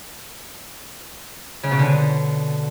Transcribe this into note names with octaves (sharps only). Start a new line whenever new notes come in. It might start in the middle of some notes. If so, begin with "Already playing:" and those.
C#3
B2
D3